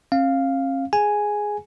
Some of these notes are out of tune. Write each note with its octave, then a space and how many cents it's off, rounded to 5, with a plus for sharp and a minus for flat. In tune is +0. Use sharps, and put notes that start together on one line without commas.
C#4 -45 F5 +0
G#4 +0 G#5 +0